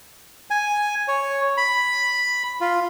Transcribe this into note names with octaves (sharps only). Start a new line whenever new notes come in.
G#5
C#5
B5
F4